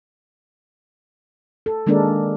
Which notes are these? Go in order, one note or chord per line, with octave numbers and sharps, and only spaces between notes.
A4
D#3 G#3 A#3 D4 A4 A#4